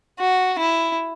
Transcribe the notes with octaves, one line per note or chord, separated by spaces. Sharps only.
F#4
E4